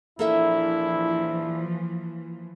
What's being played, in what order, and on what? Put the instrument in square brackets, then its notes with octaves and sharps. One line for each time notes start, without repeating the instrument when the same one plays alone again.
[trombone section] A#1 D4 E4 [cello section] E3 F3 [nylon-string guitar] A#3 A4 E5